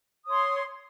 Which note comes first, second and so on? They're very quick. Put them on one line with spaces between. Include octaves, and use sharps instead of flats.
D#6 C#5 C6